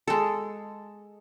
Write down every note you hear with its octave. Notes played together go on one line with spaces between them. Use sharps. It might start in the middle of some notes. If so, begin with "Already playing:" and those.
G#3 A4